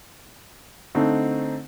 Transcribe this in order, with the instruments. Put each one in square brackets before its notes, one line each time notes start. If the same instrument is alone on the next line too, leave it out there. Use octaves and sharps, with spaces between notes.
[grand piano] D3 A3 C4 D#4